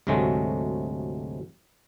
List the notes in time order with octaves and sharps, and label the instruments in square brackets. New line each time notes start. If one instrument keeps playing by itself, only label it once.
[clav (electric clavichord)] D2 G#2 C3 F#3 G#3 A3